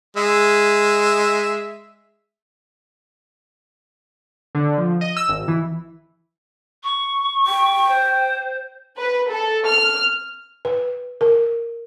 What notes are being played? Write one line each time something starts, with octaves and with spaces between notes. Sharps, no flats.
G#3 E5
D3
F3
D#5
E6
G#1
E3
C#6
G5
C5
B4
A4
F6
B4
A#4